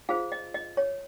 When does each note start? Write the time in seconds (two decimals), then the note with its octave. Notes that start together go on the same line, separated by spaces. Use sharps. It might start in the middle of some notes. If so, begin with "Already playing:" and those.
0.09 F4 G#4 C5 F5
0.32 D#5
0.54 D#5
0.77 C#5